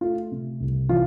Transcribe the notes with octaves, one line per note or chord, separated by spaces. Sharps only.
A3 F4
C3
C2
E3 F4